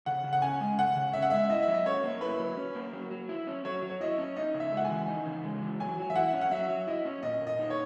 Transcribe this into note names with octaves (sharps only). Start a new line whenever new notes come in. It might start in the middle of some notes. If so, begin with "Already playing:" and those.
C#3 F#5
C#3
F#5
C#4 G#5
G#3
C#3 F#5
C#3
C#4 E5
F#5
G#3 E5
E4 D#5
E5
F#3
D#5
C#4 C#5
A#3
E4 B4
F#3
C#4
A#3
F#3
F#3
E4
C#4
F#3 C#5
F#3
C#5
E4 D#5
C#4
D#4 D#5
C#3
E5
G#3 F#5
G#5
E3
D#4
C#3
G#3
E3
F#3 G#5
F#3
E5
E4 F#5
C#4
F#5
F#3 E5
F#3
E4 D#5
C#4
A#2 D#5
A#2
D#5
D#4
C#5